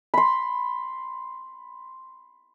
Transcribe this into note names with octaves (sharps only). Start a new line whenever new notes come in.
B5 C6